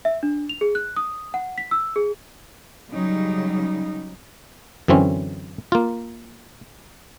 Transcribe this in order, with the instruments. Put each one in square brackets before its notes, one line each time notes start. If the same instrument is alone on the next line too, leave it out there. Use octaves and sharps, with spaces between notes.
[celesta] E5
D4
F7
G#4
F#6
D#6
F#5
B6
E6
G#4
[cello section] C#3 F#3 G3 D#4
[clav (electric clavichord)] F#2 D3 E3 C4 C#4
A#3 F4